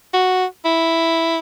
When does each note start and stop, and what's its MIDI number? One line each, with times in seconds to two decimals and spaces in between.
0.13 0.45 66
0.65 1.39 64